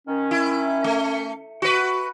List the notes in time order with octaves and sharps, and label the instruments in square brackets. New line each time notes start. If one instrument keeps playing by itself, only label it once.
[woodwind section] D#3 C#4
[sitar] E4
A3
F#4 B4